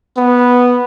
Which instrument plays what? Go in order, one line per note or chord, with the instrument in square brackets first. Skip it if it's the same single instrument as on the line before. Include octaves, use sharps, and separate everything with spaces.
[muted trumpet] B3